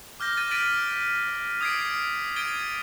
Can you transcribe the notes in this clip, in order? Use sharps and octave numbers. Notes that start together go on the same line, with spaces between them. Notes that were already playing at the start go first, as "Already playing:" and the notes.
D6 F6 G6 A#6
A6 D#7
G6 A6 B6 D7 D#7 F#7
D#6 E6 G#6 B6 C7 D7
G#6 A6 D7 D#7 G7